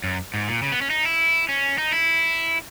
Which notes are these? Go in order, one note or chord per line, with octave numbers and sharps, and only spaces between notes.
F#2
G#2
A#2
C#3
B3
C#4
D#4
E4
C#4
D#4
E4